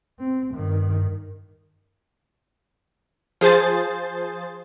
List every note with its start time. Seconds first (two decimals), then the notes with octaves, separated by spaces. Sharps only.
0.19 C4
0.53 G2 D#3
3.41 F3 G#4 C5 A6